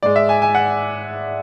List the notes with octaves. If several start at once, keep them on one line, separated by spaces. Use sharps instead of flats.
G#2 G#3 D5
E5
G#5
G#5
F#5